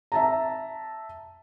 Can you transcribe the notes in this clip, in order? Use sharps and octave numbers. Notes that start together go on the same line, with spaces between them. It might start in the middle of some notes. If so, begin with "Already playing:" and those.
E5 A5 A#5